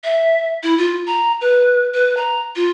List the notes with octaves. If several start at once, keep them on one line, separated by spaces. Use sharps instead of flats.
E5
E4
F4
A#5
B4
B4
A#5
F4